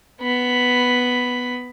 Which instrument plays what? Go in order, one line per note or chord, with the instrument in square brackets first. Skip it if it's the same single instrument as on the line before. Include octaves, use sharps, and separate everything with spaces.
[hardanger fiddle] B3 B5